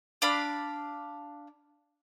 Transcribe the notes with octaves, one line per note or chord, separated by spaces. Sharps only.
D4 D5 F5 B5